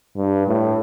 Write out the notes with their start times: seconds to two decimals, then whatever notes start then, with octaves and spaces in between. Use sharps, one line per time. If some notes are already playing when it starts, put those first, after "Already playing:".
0.17 G2
0.47 A2